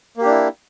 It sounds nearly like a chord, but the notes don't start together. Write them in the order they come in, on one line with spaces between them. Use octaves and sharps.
A#3 G4 D4 E4